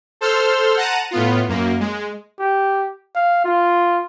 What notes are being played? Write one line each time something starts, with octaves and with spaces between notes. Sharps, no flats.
A4 C5 C6 E6 F6
F#5 A5 A#5 F#6 D#7
A2 B3 F4
F#2 A#3
G#3
G4
F5
F4